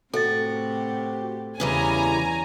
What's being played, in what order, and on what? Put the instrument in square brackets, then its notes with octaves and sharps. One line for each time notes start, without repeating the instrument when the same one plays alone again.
[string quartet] A2 C3 G4 [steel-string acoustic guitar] F#4 [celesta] A4 A6
[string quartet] E2 C#4 [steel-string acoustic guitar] C#3 E3 G3 [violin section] G#5 A#5